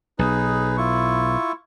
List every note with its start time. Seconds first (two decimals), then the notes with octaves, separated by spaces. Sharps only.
0.19 B1 D#4 G#4 B4
0.77 E4 F4 C#6